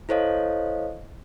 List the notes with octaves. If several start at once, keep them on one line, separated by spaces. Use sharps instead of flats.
E4 A4 C5 C#5 D#5 F5